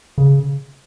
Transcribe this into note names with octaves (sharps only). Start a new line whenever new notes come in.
C#3